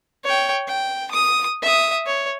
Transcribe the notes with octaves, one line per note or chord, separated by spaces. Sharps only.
C#5 G5
G5
D#6
E5 D#6
C#5